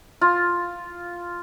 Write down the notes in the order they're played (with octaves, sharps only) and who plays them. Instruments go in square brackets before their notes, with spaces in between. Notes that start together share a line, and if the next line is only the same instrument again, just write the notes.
[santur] F4